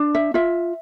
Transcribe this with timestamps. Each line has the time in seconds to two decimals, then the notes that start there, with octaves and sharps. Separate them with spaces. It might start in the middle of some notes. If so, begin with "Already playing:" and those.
Already playing: D4
0.15 E5
0.34 F4 E5